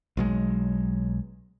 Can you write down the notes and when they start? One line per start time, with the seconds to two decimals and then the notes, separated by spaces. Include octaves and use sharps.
0.17 B1 F#3 G#3